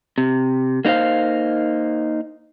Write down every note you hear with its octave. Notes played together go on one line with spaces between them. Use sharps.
C3
A#3 D#4 E4 C5 F5